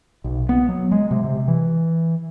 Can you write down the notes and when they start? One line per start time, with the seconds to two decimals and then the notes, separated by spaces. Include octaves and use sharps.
0.24 B1
0.49 B3
0.69 F#3
0.92 G#3
1.11 C3
1.24 C3
1.48 E3